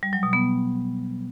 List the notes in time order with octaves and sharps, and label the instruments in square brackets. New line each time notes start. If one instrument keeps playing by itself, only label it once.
[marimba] G3
F#3
B2
B3